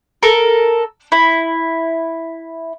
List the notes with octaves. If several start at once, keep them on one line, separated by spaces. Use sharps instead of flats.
A4 A#4
E4